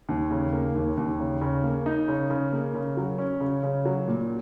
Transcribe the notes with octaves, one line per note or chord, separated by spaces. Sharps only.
D#2
C#3
A#3
D#2
D#2
C#3
C#3
A#3
D#4
C#3
C#3
A#3
C#3
F#3
C#4
C#3
C#3
F#3
A#2